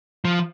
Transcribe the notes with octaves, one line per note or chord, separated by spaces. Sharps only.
F3